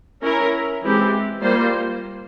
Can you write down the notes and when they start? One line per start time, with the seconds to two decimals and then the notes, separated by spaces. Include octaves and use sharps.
0.21 C#4 E4 A#4
0.82 E3 G#3 C4 G4
1.40 G3 A#3 F4 C5